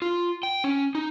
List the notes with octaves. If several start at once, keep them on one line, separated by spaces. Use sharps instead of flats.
F4
G5
C#4
D#4